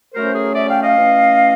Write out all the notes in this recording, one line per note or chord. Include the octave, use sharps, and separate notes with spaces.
A2 F#3 A3 C#4 A#4 C5
G#4 A#4
D5 E5
F5 G5
D#5 F5
E3 A3 C#4